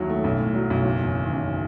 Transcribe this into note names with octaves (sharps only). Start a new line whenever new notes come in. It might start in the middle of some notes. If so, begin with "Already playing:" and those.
Already playing: D#2 D#3 F#3 E4
A3
B1
A2
F#3
B1
F#1
E2
D#3
F#1